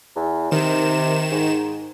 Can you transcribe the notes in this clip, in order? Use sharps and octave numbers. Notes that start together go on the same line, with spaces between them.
E2
C3 D#3 E7
G#2